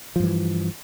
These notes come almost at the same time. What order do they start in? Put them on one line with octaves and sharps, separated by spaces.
F3 G2 E3